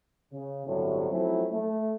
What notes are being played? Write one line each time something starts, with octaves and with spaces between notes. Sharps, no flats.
C#3
G1 A2 C3 F#3
F3 F#3 A3 C4 C#4 E4
A3